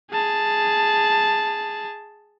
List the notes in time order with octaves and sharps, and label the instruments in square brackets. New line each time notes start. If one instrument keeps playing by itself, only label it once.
[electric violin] G#4 A5